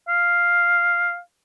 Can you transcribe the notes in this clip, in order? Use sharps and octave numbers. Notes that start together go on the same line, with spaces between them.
F5